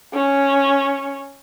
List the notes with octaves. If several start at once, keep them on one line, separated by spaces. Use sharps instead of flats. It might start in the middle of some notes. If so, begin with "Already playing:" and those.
C#4